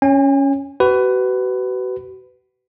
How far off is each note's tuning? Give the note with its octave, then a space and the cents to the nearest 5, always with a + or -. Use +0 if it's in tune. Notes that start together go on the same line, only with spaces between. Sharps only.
C#4 +0 G#5 -45
F#4 +35 B4 +15